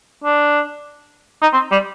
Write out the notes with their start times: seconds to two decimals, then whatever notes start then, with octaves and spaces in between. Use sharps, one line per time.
0.24 D4
1.42 D#4
1.53 C4
1.72 G3